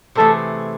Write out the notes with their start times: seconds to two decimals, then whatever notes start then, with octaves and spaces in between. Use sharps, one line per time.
0.15 C3 E3 A3 E4 G#4 A4